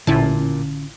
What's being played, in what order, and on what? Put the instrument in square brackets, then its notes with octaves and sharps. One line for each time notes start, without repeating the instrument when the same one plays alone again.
[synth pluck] A1 E4 A5 [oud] A#2 [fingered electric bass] D3 C#4